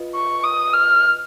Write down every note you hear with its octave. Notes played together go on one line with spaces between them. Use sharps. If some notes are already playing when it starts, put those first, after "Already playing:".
Already playing: F4 B4 D#5
C#6
D#6
F6